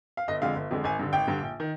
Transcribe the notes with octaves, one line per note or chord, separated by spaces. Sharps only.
F5
G1 D#5
F2 D3 G#3 F5
G1
F2 D3 G#3
G#1 G#5
G2 D3
G#1 G5
G2 D3
A#1
D#3